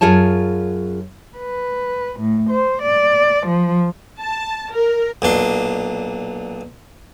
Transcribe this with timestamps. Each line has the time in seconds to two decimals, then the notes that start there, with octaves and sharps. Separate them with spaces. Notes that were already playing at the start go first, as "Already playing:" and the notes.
0.01 F#2 F4 G#4 C#5 A5
1.37 B4
2.19 A2
2.49 C5
2.82 D5
3.47 F3
4.20 A5
4.72 A#4
5.22 B1 A#2 D4 C6